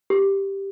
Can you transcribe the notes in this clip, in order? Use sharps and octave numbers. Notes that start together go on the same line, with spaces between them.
G4